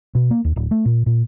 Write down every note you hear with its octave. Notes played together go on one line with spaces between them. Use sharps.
B2
A#3
D#2
D1
A3
A#2
A#2